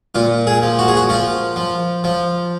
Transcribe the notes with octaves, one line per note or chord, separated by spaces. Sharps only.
A#2 F4
G#4
F3
F#4
G#4
F#4
F3 F4
F3
F3